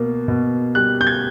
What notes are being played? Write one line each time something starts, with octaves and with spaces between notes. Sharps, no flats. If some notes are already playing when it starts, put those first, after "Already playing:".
Already playing: B2 A#3
B2
G3 F#6
G6
G#6